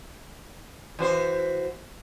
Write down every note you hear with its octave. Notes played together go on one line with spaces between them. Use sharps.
E3 F#4 C5